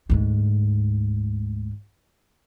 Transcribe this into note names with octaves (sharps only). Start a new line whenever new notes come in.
D2 G#2